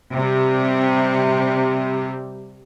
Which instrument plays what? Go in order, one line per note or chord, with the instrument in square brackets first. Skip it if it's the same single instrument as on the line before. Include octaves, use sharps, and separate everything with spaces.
[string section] C3 G3